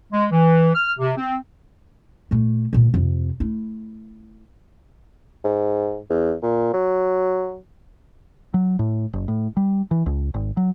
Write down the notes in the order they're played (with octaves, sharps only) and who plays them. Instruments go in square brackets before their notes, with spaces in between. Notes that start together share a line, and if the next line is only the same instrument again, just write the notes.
[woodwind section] G#3
E3
F6
C3
C4
[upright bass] A#2 A3
D2 A#2
F2 C3
A3 E4
[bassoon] G#2
E2
A#2
F#3
[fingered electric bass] F#3
A2
F#1
A2
G3
E3
C#2
G#1
F#3